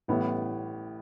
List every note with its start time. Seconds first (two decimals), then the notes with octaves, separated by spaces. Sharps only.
0.08 A1 A2 G3 B3